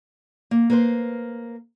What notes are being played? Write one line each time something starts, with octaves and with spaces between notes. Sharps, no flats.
A#3
A#3 B4 C5